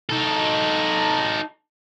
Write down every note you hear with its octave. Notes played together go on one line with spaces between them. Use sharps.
D#4 A4